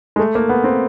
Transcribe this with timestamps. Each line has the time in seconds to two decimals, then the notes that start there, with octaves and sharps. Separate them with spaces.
0.16 G#3
0.19 A3
0.35 A#3
0.49 B3
0.64 C4